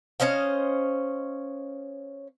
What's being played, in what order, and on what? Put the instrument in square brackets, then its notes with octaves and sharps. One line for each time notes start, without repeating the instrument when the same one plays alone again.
[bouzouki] C#4 C5 D#5 F5